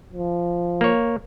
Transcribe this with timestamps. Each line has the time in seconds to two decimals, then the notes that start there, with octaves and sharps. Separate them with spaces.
0.13 F3
0.81 A#3 C#5